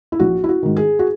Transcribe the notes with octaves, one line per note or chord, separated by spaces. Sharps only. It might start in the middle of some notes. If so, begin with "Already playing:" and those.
E4
A#1 F#4
E4
F#4
G#2 D#3
G#4
F#4